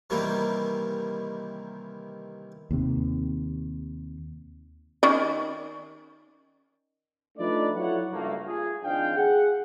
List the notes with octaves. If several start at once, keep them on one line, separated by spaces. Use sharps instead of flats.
C3 D#3 E3 G3 A#3
D#2 C3
D#3 C#4 D5
F3 A3 D4 D#4 B4 D5
F#3 E4 F4 A4 C#5 F#5
C#2 G2 A3 A#3
F4 G#4
G#1 G#2 F3 D4 F5 G5
G#4 F#5